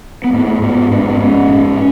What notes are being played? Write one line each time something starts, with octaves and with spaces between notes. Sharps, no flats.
B3
G#2 A3
G#2 B3
G#2 D4
B3
G#2 C#4
G#2